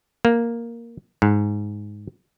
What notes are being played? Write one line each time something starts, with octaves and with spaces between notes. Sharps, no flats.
A#3
G#2